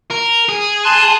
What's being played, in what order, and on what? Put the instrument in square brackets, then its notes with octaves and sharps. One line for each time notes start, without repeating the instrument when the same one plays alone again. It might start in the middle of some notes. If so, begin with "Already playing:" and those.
[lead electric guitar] A#4
G#4
[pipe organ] A5 C6 F#6